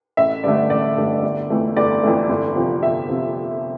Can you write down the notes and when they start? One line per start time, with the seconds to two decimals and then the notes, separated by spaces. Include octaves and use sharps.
0.17 A1 E5
0.44 G2 D3 A3 D5
0.70 A1 D5
0.97 G2 D3 A3
1.23 G1
1.50 F2 E3 A3
1.77 G1 D5
2.03 F2 E3 A3
2.30 G1
2.56 F2 C3 F3
2.82 G1 E5
3.09 C3 F3